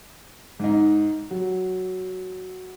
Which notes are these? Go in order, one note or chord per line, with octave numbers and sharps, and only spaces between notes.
G#2 D#4
F#3